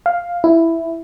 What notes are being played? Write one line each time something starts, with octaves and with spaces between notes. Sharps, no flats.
F5
E4